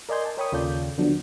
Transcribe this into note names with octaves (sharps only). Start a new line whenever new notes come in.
A#4 D5 D#5 G#5 C6 G6
A5
A#4 C#5 G5 B5 C#6 D#6
D#2 C#3 F4 A4 D5 G6
D3 F3 F#3 B3 D4